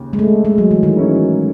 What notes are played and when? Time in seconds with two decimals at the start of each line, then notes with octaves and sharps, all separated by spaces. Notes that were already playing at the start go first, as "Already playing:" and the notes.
Already playing: D#2 C#3
0.13 G#3
0.19 A3
0.45 G#3
0.58 F#3
0.71 E3
0.83 D#3
0.97 G#2 F#3 C#4 E4